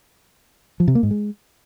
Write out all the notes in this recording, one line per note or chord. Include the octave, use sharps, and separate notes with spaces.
F3
C3
A#3
G#2
G#3